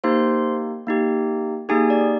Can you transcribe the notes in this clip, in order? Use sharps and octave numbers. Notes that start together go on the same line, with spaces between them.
A#3 D#4 G4 C5 C6
A#3 D#4 G4
A#3 D#4 G4 G#4 G#5
D5